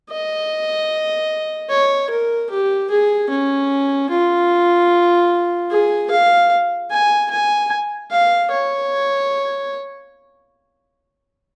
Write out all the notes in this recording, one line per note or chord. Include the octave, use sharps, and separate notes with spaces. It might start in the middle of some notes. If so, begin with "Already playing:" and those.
D#5
C#5
A#4
G4
G#4
C#4
F4
G#4
F5
G#5
G#5
F5
C#5